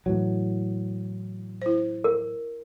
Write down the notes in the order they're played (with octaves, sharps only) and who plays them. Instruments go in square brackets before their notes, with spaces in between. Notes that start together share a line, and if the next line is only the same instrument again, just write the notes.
[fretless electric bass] A2 E3 F#3
[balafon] E4 C5
[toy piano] A#4